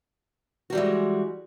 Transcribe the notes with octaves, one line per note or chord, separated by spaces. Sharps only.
E3 G3 G#3 F#4